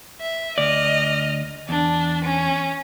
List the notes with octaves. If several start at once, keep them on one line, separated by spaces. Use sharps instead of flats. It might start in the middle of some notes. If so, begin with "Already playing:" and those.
E5
D2 D5 D#5 F6
E2 D4
C#4